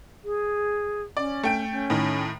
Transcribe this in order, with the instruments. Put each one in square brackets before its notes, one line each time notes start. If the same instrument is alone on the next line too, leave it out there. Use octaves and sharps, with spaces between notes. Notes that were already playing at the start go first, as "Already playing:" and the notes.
[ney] G#4
[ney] C#4 [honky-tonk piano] D5
[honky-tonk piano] A3 G5 D7
[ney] C#4
[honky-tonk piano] A2 D#3